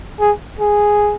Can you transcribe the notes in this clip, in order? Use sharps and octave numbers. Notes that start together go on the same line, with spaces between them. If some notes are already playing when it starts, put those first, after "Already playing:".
G#4
G#4